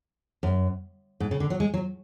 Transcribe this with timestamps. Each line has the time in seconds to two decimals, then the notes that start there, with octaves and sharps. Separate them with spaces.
0.43 F#2
1.20 G#2
1.31 C#3
1.40 D3
1.50 F#3
1.60 G#3
1.74 F#3